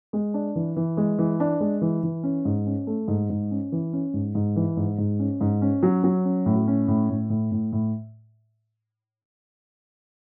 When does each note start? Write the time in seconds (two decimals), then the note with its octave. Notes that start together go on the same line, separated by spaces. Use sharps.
0.13 G#3
0.34 D4
0.56 E3
0.76 E3
0.97 G#3
1.19 E3
1.40 D4
1.60 G#3
1.81 E3
2.03 E3
2.23 C#4
2.45 G#2
2.66 C#4
2.87 A3
3.08 G#2
3.30 G#2
3.51 C#4
3.72 E3
3.93 C#4
4.14 G#2
4.35 G#2
4.56 E3
4.77 G#2
4.98 G#2
5.19 C#4
5.41 G#2
5.62 C#4
5.83 F#3
6.04 F#3
6.25 C#4
6.46 A2
6.67 C#4
6.88 A2
7.10 A2
7.30 A2
7.52 A2
7.72 A2